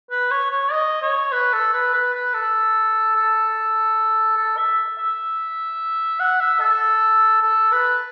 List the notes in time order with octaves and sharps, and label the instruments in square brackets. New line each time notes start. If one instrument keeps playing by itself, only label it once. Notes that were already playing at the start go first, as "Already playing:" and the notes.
[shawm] B4
C#5
C#5
D#5
C#5
B4
A4
B4
B4
B4
A4
A4
A4
E5
E5
F#5
E5
A4
A4
B4